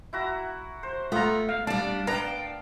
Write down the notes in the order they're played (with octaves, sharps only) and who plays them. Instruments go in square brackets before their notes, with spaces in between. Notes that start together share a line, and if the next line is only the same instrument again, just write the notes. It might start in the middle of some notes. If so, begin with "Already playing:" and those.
[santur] E4 F#4 A#5
C5
[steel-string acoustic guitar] A3 [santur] B3 [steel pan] F4 A#5
[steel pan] F5
[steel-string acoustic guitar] G3 D4 [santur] D5 F5 [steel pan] A5
[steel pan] A#4 B4 A#5 [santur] D5 F5 A5 [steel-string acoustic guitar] G5